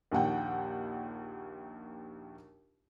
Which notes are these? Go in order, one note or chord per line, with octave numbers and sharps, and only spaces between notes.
A#1 D#2 F#5 G5